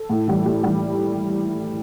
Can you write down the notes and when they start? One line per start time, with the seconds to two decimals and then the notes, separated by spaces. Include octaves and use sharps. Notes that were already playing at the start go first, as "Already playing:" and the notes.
Already playing: A4
0.09 A2
0.27 E3 G3
0.45 A2 G4
0.63 E3 G3